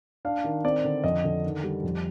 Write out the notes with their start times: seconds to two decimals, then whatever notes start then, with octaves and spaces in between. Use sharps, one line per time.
0.25 D4 F5
0.44 D#3
0.64 C4 D5
0.84 D3
1.04 F2 D#5
1.24 D3
1.44 D#3
1.63 G3
1.83 F2